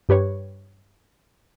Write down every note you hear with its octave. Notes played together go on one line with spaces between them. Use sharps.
G2 G4 B4 C#5